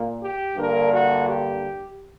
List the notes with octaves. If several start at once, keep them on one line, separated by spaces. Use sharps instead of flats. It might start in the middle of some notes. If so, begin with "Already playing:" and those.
Already playing: A#2 A#3
G4
G2 D3 A#3 A#4
F#4
G4